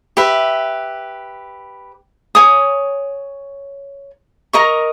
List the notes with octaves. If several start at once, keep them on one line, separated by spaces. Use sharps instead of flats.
G4 B4 E5
C#5 G#5 D#6
A#4 D#5 A#5 C#6